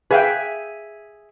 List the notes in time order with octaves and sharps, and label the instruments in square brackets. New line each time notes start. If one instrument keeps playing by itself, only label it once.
[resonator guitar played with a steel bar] G#4 E5 [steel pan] B4 F5 G5